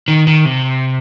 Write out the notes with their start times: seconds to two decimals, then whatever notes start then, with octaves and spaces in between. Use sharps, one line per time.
0.08 D#3
0.27 D#3
0.45 C3